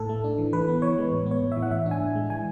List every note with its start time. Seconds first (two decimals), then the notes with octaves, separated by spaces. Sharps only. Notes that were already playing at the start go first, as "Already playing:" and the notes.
Already playing: A2 A4
0.09 A3
0.24 D4
0.38 E3
0.53 E3 B4
0.68 B3
0.82 E3 C#5
0.98 G#3
1.12 A2
1.26 B3
1.31 C#5
1.42 A2
1.52 E3 E5
1.63 F#5
1.71 A2 E5
1.86 D4
1.91 G#5
2.00 A2
2.15 G#3
2.30 E3 G#5